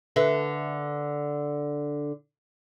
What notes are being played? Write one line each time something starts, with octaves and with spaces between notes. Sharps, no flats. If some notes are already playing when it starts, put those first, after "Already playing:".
D3 B4 E5